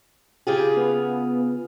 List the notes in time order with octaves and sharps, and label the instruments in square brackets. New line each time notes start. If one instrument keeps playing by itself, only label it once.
[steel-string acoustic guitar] C#3 F4 G#4 [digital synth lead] G4
[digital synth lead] B3